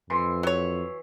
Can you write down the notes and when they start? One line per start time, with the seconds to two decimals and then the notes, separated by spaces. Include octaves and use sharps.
0.10 F2 E3 C6
0.43 F#3 C#5